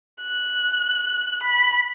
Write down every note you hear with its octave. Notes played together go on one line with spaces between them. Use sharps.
F#6
B5